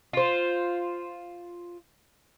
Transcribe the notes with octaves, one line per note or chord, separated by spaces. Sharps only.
F4 C5